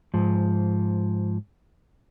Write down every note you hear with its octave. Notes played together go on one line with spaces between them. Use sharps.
G#2 F3